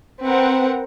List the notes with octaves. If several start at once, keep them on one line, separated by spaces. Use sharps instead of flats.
C4 A#4 B4 F#5